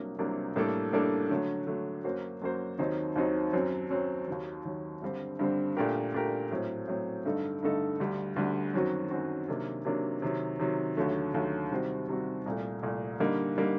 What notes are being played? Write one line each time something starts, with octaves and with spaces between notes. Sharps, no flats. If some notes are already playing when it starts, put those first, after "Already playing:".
Already playing: C2 C3 F#3 A#3 D4
C2 C3 F#3 A#3 D4
A2 G3 A#3 D4 A4
A2 G3 A#3 D4 A4
D3 F#3 A3
D3 F#3 A3
F#2 F#3 A#3 F#4 C5
F#2 F#3 A#3 F#4 C5
D#2 D#3 F#3 C4 D#4
D#2 D#3 F#3 C4 D#4
F#2 F#3 C4
F#2 F#3 C4
D#2 D#3 F#3
D#2 D#3 F#3
G2 D3 G3 C4
G2 D3 G3 C4
A#2 A3 D4 G4 A#4
A#2 A3 D4 G4 A#4
A2 F#3 C4
A2 F#3 C4
G2 D3 A3 D#4 A4
G2 D3 A3 D#4 A4
D2 D3 G3
D2 D3 G3
F#2 D#3 F#3 C4 F#4
F#2 D#3 F#3 C4 F#4
C3 D#3 F#3 A#3 D4
C3 D#3 F#3 A#3 D4
C3 D#3 F#3
C3 D#3 F#3
D#2 D3 F#3 A3
D#2 D3 F#3 A3
C3 D#3 G3 C4 F#4
C3 D#3 G3 C4 F#4
C2 A#2 A3
C2 A#2 A3
D3 G3 A#3 D#4
D3 G3 A#3 D#4